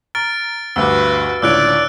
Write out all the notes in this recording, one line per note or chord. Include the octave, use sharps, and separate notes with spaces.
A#5 F6 A6 D7
D2 G2 F#4 B4 D6 E6
C#2 A2 D3 C#5 D5 E6 F#6 D7